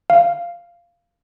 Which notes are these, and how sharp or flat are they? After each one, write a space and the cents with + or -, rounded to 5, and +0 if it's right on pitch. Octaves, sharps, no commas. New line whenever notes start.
F5 -10